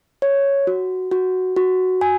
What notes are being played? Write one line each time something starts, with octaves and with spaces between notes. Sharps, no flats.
C#5
F#4
F#4
F#4
G#5